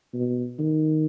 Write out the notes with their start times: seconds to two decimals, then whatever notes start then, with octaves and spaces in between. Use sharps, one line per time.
0.14 B2
0.59 D#3